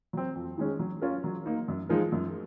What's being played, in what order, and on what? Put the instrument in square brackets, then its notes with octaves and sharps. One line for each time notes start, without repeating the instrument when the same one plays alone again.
[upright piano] F#3 C4
F2
D#3 G#3 C#4
F#3
C#4 F4 A#4
F#3
A#3 D#4
F#2
F3 G#3 D#4 A#4
F#2